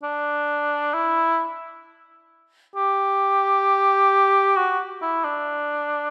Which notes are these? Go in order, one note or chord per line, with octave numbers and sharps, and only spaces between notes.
D4
E4
G4
F#4
E4
D4